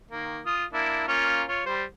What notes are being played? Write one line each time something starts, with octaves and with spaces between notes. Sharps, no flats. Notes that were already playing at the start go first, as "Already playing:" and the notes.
D#3 A#3
F4 D#6
A#3 D4 E4
A#3 C#4 F4
F4 C#5
G3 C5